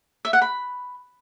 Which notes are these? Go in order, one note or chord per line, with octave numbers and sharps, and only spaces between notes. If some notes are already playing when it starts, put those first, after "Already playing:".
E5
F#5
B5